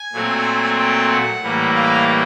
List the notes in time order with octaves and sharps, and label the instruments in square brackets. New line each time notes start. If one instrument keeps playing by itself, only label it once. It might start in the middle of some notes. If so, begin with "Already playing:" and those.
Already playing: [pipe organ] G#5
A#2 F#3 A3 C4
G5
F#5
A2 E3 G3 A#3
F5